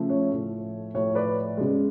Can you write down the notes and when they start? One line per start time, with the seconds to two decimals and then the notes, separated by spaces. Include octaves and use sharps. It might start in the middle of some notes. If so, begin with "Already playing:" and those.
Already playing: C#3 F3 A3
0.10 C#5
0.31 A2 F3 A3
0.94 A2 F3 A3 C#5
1.15 B4 D5
1.57 C#3 G#3